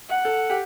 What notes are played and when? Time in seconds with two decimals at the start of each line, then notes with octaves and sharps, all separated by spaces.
0.09 F#5
0.25 A4
0.50 G4